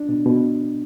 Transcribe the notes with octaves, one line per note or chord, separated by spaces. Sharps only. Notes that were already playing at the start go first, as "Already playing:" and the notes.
Already playing: D4
B2
B2